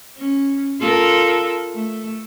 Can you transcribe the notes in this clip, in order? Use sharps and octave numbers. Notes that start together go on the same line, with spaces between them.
C#4
F4 A4 A#4
A3